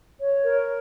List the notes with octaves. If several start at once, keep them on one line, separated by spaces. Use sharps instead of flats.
C#5
A#4